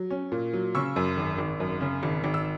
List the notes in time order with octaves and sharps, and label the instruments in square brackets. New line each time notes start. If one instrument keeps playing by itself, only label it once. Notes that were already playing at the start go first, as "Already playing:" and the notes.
Already playing: [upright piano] F#3
C#4
A#2
F#3
C#3 C#6 E6
F#2
G#1
G#1
F#2
C#3
G#1
G#1
E6